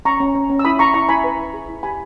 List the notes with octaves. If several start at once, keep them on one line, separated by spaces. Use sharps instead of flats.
C#4 A#5 C#6
C#4
C#4
C#4
E6
E4 B5 D#6
E4 A#5 C#6
E4 A#5 C#6
E4 G#5 B5
B4
B4
G#4
E4
G4 G#5 B5